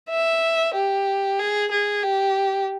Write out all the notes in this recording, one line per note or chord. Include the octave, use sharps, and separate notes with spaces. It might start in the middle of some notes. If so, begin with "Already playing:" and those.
E5
G4
G#4
G#4
G4